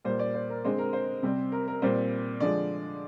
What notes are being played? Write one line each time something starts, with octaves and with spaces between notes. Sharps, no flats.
A#2 G3 A#3 C5
D5
C5
A#4
D3 G#3 C4 C5
A#4
C5
C3 G3 C4
A#4
A#4
A#2 G3 C4 C5
D3 F3 G#3 D5